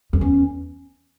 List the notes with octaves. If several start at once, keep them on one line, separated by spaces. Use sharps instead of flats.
F2
E2 C#4